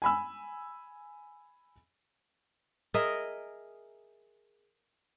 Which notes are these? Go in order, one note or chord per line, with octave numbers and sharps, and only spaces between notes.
G#5 B5 E6
G#4 A#4 D#5 E5